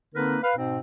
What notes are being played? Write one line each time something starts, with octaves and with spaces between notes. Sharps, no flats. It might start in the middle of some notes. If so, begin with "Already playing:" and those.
D3 A#3 C4 D#4 A#4 B4
B4 F5
G#2 B2 C4